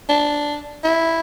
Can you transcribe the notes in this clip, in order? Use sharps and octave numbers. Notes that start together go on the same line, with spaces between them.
D4
E4